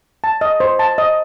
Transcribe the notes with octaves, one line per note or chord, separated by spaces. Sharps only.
A5
D#5
C5
A5
D#5